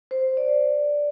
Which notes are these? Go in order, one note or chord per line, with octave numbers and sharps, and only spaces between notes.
C5
D5